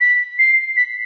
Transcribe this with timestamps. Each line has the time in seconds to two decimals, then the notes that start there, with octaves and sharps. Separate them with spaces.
0.01 B6
0.39 C7
0.77 B6